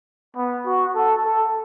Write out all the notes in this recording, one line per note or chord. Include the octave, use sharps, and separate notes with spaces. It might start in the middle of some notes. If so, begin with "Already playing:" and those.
B3
F#4
A4
A4